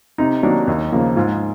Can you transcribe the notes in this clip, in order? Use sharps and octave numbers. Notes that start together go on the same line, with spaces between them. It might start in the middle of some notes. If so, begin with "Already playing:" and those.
C3 D#4
D#3 F#3 A#3 D4
D#2
C#3 F3 A#3
G#2 F4